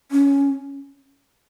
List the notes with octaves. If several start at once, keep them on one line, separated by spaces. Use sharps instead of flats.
C#4